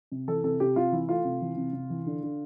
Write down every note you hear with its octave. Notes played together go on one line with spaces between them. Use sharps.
C3
E3 A4
C3 A4
C3 G4
C3 F4
E3 E4
A3 F4
C3
E3
C3
C3
E3
D3
D3